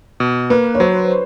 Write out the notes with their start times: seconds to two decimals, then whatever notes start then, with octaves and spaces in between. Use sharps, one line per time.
0.20 B2
0.50 A#3 B4
0.74 C#5
0.80 F#3 C5